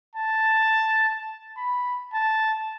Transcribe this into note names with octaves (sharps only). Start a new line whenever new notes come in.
A5
B5
A5